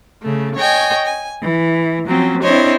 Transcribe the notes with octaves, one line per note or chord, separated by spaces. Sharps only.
C#3 A3
C#5 D#5 G5 G#5
G#5
E3
F3 F#3 C4 C#4
C4 D4 E4 C5 C#5 D#5